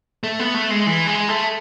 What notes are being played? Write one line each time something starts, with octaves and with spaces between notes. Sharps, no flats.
A3
B3
A3
G#3
E3
G#3
A3